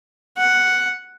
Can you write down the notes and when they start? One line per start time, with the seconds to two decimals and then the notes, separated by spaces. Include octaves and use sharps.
0.37 F#5